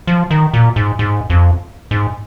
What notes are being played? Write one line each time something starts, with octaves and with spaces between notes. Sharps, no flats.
F3
D#3
A#2
G#2
G#2
F2
G#2